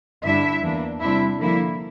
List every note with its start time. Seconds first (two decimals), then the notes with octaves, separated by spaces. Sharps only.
0.24 G2 D3 G3 D4 E4 E5
0.62 E2 E3 A#3 D4
1.01 C3 G3 D4 E4 E5
1.39 D3 F3 A#3 E4